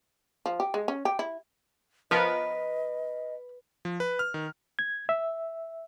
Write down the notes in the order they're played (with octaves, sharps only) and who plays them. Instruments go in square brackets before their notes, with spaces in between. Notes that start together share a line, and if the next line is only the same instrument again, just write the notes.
[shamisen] F3
G4
G#3
C#4
G4
E4
[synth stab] F3 B3 A#4 [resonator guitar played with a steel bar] B4 [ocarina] D#5
[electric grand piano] F3
B4
F6
D#3
[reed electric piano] G#6
E5